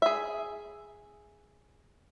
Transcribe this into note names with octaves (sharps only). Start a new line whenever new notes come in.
G#4 E5